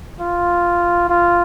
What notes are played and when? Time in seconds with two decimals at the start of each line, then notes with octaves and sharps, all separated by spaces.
0.20 F4
1.09 F4